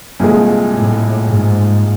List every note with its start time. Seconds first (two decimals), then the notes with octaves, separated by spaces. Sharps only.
0.19 C2 A#2 F3 G#3
0.75 A2
1.31 G#2